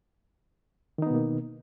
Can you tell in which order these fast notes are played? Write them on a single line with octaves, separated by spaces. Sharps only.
D#3 D#4 B3 B2 A#3